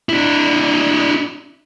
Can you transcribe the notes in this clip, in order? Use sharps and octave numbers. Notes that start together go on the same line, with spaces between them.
D4 E4